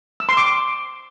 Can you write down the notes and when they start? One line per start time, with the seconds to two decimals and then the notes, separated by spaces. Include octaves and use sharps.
0.20 E6
0.29 C6
0.37 D6